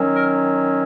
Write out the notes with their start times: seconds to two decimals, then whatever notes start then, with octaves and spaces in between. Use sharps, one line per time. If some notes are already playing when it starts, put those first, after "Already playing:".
Already playing: D#3 F#3 C#4
0.14 A#4